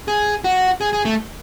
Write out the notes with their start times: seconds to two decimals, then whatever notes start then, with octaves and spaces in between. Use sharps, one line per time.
0.08 G#4
0.44 F#4
0.81 G#4
0.93 G#4
1.05 A3